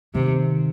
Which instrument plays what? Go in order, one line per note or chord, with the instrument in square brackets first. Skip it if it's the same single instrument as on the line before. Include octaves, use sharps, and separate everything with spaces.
[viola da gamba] C3 [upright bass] D#3